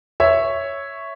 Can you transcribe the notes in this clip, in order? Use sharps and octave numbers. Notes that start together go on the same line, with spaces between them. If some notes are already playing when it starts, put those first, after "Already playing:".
C#5 E5